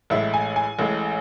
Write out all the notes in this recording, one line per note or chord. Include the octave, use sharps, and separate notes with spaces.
A1 A2 G#3 E5
G#5
G#5
A1 A2 G#3